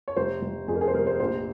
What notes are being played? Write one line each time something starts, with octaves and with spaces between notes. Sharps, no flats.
C#5
F1 C5
F1
F2 G#4
A#4
G#4
C5
F1 A#4
C5
A#1 C5